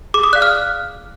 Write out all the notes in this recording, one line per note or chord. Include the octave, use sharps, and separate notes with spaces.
G#4 D6
D#6
D5 F5 F#6
F6